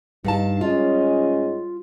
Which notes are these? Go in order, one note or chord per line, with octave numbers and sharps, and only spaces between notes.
G2 D#4 F5 A5
G#2 C#4 F4 D#5